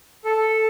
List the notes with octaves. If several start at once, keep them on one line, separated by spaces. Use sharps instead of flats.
A4